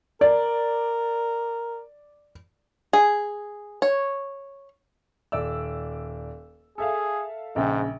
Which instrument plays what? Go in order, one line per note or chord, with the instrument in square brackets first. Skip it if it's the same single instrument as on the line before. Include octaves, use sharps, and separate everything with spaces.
[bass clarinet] A#4 [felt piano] D5
[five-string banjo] G#4
C#5
[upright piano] D#1 D5 E6
[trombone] G#4 [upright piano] A4 E5 F5
[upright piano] A#1 C#3 G5 [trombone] G#2